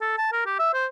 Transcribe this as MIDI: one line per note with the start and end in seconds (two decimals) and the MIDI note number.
0.01 0.14 69
0.18 0.29 81
0.32 0.42 70
0.46 0.59 67
0.59 0.73 76
0.74 0.86 72